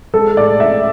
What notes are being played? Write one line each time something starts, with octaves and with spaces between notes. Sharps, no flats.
G#3 A4
A2 D5
A2 E5